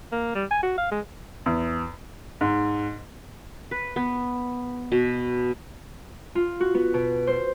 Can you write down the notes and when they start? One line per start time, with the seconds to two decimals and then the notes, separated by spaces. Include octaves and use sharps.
0.12 A#3
0.35 G3
0.51 G#5
0.63 F#4
0.78 F5
0.91 G#3
1.46 E2
2.41 G#2
3.71 B4
3.96 B3
4.92 B2
6.35 F4
6.60 F#4
6.74 B3
6.94 B2
7.27 C5